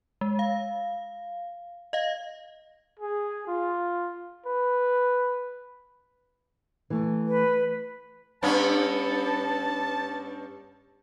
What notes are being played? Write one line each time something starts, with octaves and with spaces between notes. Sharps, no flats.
G#3
F5
D#5 F5
G#4
F4
B4
E3 A3
B4
G2 B3 C#4 A5